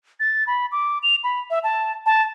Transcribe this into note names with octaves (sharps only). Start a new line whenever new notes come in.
A6
B5
D6
F7
B5
E5
A5
A5